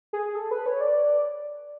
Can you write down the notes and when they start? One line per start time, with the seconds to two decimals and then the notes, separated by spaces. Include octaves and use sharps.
0.13 G#4
0.35 A4
0.51 B4
0.66 C#5
0.81 D5